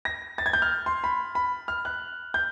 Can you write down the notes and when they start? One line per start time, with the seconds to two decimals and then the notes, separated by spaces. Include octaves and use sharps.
0.05 A#6
0.38 A6
0.46 G#6
0.53 G6
0.62 F6
0.86 C6
1.04 B5
1.35 B5
1.68 F6
1.85 F#6
2.34 G6